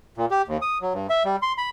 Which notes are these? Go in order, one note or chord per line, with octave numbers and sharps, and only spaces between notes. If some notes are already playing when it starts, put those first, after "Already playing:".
A#2
G4
D#2
D#6
F#3
G2
E5
G3
C6
B5